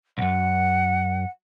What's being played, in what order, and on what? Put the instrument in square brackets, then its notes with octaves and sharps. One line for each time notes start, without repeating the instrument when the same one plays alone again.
[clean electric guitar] B1 F#2 [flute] F#5